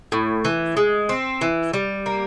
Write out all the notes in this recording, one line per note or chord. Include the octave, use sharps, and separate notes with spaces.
A2
E3
G#3
C4
E3
G3
A#3